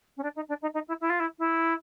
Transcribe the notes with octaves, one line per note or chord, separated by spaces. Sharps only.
C#4
D4
D#4
D4
D#4
D#4
E4
E4
F4
E4
E4